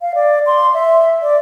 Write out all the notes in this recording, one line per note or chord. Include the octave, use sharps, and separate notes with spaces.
F5
D5
C6
E5
D5